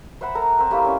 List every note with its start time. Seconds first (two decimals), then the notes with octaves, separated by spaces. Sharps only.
0.21 C5 E5 F#5 B5
0.35 A4 A#4 A#5
0.59 C4 A#4
0.71 G3 A3 A#3 E4
0.85 C#4